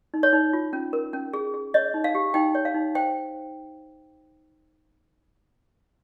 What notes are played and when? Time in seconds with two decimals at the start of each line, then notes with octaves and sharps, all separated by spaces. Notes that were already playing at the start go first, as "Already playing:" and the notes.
0.14 D#4
0.23 C#5
0.33 D#4
0.53 F4
0.73 C#4
0.93 A#4
1.13 C#4
1.33 G#4
1.54 G#4
1.74 C#5 D#5
1.94 D#4
2.04 F5
2.15 G4
2.34 D#4 G5
2.55 C#5
2.65 F5
2.74 D#4
2.95 C5 G5